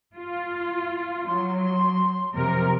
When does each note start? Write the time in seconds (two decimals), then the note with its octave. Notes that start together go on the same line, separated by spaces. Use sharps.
0.15 F4
1.28 F#3 C6
2.33 F2 C3 A#4